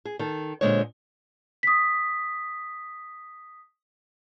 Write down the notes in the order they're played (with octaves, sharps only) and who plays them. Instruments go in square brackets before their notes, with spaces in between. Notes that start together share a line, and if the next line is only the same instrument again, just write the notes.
[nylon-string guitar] G#4
D#3 A4
A#2 D3 F3 G#3 C5 C#5
[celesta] D#6 B6